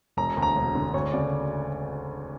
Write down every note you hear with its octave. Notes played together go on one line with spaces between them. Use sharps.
E1 A#5
D2
A#5
E1
D3
D2 C#5
C#3 D5